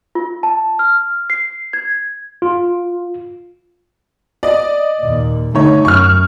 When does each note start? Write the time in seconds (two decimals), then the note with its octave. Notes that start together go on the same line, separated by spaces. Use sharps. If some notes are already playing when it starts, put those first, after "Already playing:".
0.15 F4
0.43 A5
0.79 F6
1.30 C7
1.73 G#6
2.42 F4
4.43 D5 D#5
5.00 D#2 A#2
5.55 D3 A3 D#4 C#5
5.85 F#2 C#6 F6